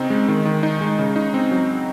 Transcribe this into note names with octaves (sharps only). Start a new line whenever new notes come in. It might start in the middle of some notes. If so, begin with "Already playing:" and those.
Already playing: C#3 C4 D#4
G#3
D#3
D#3
D#4
G#3
C#3
D#4
C4
F#3